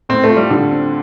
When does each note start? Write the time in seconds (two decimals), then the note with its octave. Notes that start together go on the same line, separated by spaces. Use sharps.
0.09 A2 C4
0.24 A3
0.30 F4
0.37 G3
0.51 D3 G3
0.71 C4